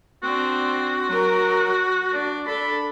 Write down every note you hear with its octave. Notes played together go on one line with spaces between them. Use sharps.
C4 D4 F#4
F#3 A#4
D4
D4 A4 B5